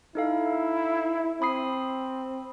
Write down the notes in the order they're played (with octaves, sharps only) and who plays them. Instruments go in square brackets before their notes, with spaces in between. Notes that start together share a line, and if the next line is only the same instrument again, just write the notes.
[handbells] D#4 A4 F5 [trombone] E4
[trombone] C4 [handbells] B5 D#6 C7